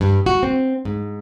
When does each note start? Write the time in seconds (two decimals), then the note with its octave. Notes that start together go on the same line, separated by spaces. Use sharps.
0.01 G2
0.26 F#4
0.43 C4
0.85 G#2